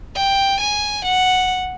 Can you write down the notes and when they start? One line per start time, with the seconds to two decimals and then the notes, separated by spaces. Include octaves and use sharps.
0.15 G5
0.61 G#5
1.05 F#5